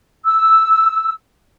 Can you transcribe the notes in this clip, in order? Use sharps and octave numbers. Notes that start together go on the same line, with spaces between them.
E6